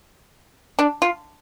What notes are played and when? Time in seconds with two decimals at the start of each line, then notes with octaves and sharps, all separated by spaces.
0.79 D4
1.02 F4